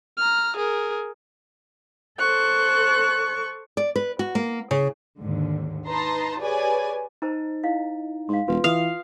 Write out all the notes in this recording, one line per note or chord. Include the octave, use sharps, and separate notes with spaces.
A#5 F6
G#4 A#4
A4 C5 C#6 F#6
D5
B4
F#4
A#3
C#3
D#2 G#2 D3
D#4 B4 A5 A#5 C6
G4 G#4 B4 C#5 D5 G#5
D#4 C5 A5 A#5
E4 D#5 F5
G#2 F5 C6
E1 F4 B4
E3 F5 D#6